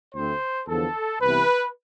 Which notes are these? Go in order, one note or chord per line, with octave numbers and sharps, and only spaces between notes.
D2 D3 A3 C4 C5
E2 D3 F3 B3 A4
C2 C3 E3 B3 B4